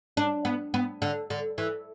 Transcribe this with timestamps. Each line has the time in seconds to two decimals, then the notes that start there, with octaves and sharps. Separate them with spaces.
0.17 D4
0.45 B3
0.74 B3
1.02 D3
1.30 D3
1.58 E3